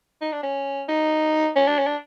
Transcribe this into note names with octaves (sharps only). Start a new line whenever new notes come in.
D#4
D4
C#4
D#4
C#4
D4
C#4
D4